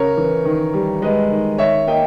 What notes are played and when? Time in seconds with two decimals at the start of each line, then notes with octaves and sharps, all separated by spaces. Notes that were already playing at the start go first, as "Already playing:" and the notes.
Already playing: C#3 A#4 C#5
0.17 E3
0.45 D#3
0.73 G3
1.02 G#3 B4 D#5
1.31 D#3
1.58 D#3 C#5 E5
1.87 A#3 D#5 G5